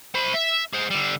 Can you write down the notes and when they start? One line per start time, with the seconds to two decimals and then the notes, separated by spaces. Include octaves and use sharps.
0.15 C5 B5
0.34 E5
0.73 G#4 C5
0.90 D3 G3